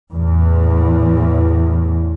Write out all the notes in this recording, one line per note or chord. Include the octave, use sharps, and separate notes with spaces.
E2 A2